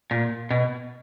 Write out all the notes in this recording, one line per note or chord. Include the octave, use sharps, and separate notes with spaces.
A#2
B2